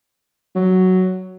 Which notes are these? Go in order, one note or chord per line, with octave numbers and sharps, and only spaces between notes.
F#3